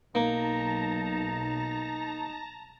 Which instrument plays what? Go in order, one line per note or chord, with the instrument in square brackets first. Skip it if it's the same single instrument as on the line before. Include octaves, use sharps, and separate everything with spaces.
[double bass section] B1 [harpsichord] A#3 [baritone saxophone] D#4 [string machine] A5 A#5 A#6